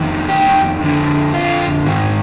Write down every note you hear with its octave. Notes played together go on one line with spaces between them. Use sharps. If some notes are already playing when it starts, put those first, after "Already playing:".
Already playing: F2 D#3
G4
F2 D3
F4
G#2 D#3